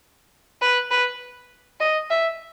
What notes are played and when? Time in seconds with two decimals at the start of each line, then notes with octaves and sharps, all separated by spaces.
0.61 B4
0.91 B4
1.80 D#5
2.10 E5